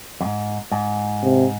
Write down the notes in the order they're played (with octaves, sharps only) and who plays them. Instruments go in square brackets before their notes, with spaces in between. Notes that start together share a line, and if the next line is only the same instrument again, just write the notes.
[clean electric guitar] F2 G#2
G#2
[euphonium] C3